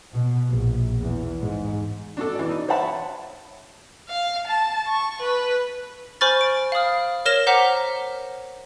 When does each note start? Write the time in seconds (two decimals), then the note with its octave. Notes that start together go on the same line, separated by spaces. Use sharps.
0.12 B2
0.50 A#1
0.98 E2
1.40 G#2
2.17 D4 F#4 A4
2.35 E3 D5
2.49 D#4
2.68 C5 C#5 E5 F#5 A5 B5
4.08 F5
4.47 A5
4.87 C#6
5.21 B4
6.21 C5 G#5 B5 C#6 F6 A6
6.41 D7
6.72 F5 B5 D#6 F6
7.26 A#4 C#5 F6 A#6 E7 G7
7.47 C5 F#5 A#5 D6 F6 B6